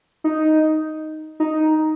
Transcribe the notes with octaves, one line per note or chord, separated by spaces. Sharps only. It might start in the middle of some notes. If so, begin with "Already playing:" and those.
D#4
D#4